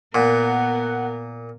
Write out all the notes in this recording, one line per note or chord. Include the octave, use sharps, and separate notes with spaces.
A#2 B3 A#4 F#5